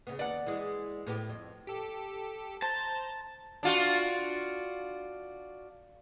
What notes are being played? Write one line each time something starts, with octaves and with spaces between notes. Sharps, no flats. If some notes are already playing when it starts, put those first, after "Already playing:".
C#3 B3
D#2 B3 D5 F#5
E3 G#3
A2 B3 G4
F2
G4 A4
C5 A5 A#5
D4 F4 F#4